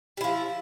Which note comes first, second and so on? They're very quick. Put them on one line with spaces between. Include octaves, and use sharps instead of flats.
G3 E4 F3